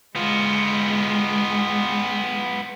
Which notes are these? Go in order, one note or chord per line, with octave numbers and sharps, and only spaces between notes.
G#3 B3 F4